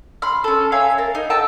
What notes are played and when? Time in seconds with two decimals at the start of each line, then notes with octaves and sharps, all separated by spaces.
0.22 B5 C6 F6
0.44 C#4 A4
0.72 C#5 E5 F5 G#5
0.98 A#4 A5
1.15 D#4
1.30 A4 G5 A5 E6